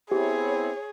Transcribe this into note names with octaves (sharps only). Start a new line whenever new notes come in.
B3 C4 E4 G4 G#4 C#5